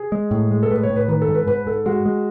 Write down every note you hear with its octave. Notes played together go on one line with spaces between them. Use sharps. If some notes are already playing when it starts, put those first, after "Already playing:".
Already playing: G#4
G#3
A2
G#3
A4
A2 B4
C#5
A2
B4
D#3 B4
A4
G#2
B4
G#2 B4
G#2 A4
G#3 F#4
G#3